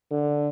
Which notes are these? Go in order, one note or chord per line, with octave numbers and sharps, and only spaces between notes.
D3